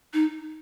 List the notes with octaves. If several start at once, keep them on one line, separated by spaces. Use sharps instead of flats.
D#4